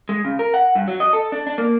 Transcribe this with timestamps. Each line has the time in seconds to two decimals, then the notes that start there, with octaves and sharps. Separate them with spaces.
0.09 G#3
0.25 C#3
0.39 A#4
0.54 F#5
0.75 G2
0.88 F#3
1.00 D#5
1.13 A4
1.32 D4
1.47 D4
1.58 A#3